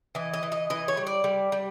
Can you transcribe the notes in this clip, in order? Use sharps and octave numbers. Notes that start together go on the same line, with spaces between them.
E3 D#5
D#5
E3
D#5
E3 D#5
C#5
G3
D5
G3
G3